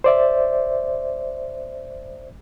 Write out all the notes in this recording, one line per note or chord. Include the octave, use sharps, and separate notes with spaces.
C5 D5 E5